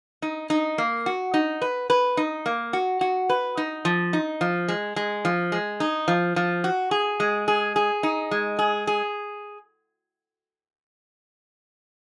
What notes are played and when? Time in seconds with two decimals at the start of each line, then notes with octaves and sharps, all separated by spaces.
0.22 D#4
0.50 D#4
0.78 A#3
1.06 F#4
1.34 D#4
1.62 B4
1.90 B4
2.17 D#4
2.46 A#3
2.73 F#4
3.01 F#4
3.29 B4
3.57 D#4
3.85 F3
4.13 D#4
4.41 F3
4.68 G#3
4.96 G#3
5.25 F3
5.52 G#3
5.80 D#4
6.08 F3
6.36 F3
6.64 F#4
6.91 G#4
7.20 G#3
7.48 G#4
7.76 G#4
8.03 D#4
8.31 G#3
8.59 G#4
8.87 G#4